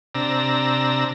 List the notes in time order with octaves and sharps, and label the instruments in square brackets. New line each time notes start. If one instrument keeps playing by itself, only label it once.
[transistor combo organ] C3 D4 A#5 E6